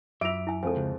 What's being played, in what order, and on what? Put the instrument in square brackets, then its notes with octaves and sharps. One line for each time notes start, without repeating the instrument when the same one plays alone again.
[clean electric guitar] F#2 [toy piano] F4 D6 [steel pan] E5 [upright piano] D7 F7
[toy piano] E4 G#5
[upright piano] F2 F3 G#3 [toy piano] A4 G#5
[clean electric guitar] C#2